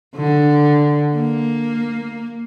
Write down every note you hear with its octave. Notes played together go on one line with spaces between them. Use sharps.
D3
A#3